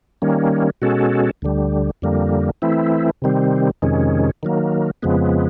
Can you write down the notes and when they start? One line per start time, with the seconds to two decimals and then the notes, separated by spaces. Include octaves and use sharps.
0.22 D#3 G3 A#3 C#4
0.82 B2 G#3 C#4 F#4 A4
1.42 D2 D3 G3
2.02 F2 D3 G3 A#3
2.62 E3 A3 C4 E4
3.22 C3 D#3 G3 C4
3.82 F2 C3 D#3 G#3 C#4
4.43 D#3 F#3 A#3
5.02 F2 C#3 F3 G#3 B3